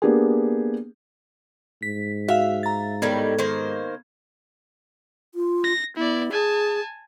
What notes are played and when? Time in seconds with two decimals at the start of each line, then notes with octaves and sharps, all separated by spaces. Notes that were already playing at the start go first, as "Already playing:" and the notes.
0.02 A#3 B3 D4 G4 G#4
1.83 G#2 B6
2.28 F#4 E5 F5
2.63 A#5 A6
3.02 A2 D#3 G3 B3 G#6
3.39 D#3 A#3 C5
5.35 F4
5.64 A#6
5.97 B3 E4 D5
6.32 G#4 G#5 A5